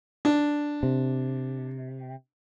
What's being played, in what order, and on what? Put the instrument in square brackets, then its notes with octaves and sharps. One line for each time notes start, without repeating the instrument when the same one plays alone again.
[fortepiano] D4
[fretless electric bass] C3